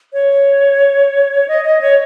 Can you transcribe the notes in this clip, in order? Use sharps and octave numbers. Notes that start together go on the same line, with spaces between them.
C#5
D#5
D#5
C#5